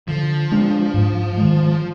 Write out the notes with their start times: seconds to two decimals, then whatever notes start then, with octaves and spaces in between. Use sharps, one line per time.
0.08 D3 F3
0.52 G#3 D4
0.94 G#2
1.37 D#3 G#3